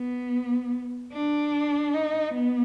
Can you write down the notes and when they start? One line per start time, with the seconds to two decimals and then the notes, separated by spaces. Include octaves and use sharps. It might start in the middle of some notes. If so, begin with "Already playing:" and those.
Already playing: B3
1.13 D4
1.94 D#4
2.34 B3